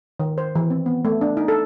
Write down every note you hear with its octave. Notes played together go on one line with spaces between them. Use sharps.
D#3
C5
E3
C4
B3
A3
D4
D#4
A4